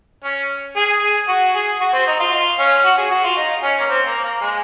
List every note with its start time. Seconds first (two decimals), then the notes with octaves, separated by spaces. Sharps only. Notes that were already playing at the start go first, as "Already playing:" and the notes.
0.24 C#4
0.76 G#4
1.02 G#4
1.28 F#4
1.54 G#4
1.80 F#4
1.93 C4
2.07 D#4
2.20 F4
2.32 F4
2.59 C#4
2.84 F#4
2.98 G#4
3.11 F#4
3.24 F4
3.36 D#4
3.63 C#4
3.80 A#3
3.89 C4
4.06 A#3
4.24 A#3
4.41 G#3